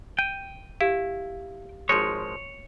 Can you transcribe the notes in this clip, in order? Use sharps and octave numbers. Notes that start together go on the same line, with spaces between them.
G5 D#7
E4 G4 F5
G#1 F3 G#3 C#5